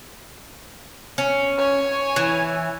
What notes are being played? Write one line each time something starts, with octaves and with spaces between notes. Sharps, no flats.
C#4
C#5 G#5
E3